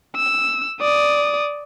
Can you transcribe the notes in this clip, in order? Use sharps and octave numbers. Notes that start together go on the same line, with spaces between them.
E6
D5 D#6